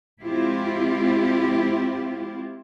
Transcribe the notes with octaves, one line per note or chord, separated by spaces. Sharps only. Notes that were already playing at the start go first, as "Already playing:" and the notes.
G#3 C4 E4 F4 G4